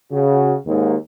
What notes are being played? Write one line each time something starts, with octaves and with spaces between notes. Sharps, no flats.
C#3 F#4
D#2 G#2